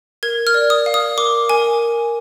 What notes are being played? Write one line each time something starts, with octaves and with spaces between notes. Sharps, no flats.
A#4 G#6
F6
D5
D#6
F5
D#6
A#4 D6
A#4 G#5